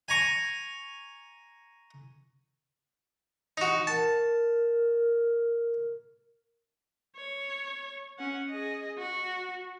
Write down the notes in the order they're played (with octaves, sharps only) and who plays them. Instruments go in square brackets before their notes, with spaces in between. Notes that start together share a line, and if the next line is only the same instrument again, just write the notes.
[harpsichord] G#5 A#5 C#6
[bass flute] E3 [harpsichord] D#4 F#4
[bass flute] A#4 [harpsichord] A5
[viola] C#5
C#4 F#5
G#4 D#5
F#4